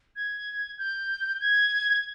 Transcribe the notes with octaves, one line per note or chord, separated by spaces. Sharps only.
G#6
G6
G#6